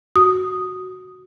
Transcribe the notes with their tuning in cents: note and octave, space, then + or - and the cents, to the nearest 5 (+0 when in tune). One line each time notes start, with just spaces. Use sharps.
F#4 +0 D#6 +0